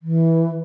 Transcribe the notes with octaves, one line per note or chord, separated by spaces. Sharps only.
E3